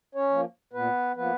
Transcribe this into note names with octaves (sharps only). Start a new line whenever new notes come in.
C#4 C#5
F3 A#3
A#2 B3 B4
F3 A#3 B3 B4